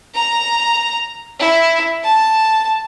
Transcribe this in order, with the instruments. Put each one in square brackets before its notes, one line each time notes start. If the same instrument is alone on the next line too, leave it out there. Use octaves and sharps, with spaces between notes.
[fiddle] A#5
E4
A5